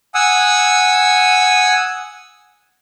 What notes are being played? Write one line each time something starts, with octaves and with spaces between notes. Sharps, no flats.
F#5 G#5 D#6 E6